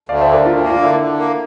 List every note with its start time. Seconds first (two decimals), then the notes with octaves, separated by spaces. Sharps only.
0.09 D2 D5 F5
0.21 C5 E5
0.27 D3
0.33 A#4 D5
0.45 D2 D4 F4
0.58 E4
0.63 A#3
0.69 D4 F4
0.82 D3 E4
1.00 D3
1.19 A#3